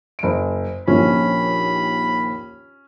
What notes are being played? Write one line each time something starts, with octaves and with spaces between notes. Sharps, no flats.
F#1 D7
A#1 D#2 F3 C#4 B5